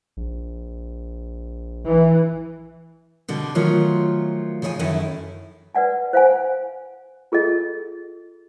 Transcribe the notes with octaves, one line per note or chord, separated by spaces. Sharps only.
A#1
E3
B2 D3 G3
D#3 F3 F#3 A3 F4 C#5
C#3 F3 C#5 D#5 G#5
F#2 D#3 A3 C#4 E4
B4 D5 F#5 G#5
C5 F5 F#5 G#5
F4 G#4 A4 D#5